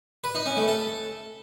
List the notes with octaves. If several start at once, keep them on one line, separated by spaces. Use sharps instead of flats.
B4
D#4
C#4
A3
A4